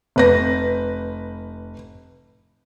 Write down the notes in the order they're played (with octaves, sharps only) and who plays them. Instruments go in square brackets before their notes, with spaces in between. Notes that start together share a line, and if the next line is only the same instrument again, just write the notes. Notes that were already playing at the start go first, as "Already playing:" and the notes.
[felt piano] F1 B4 A#6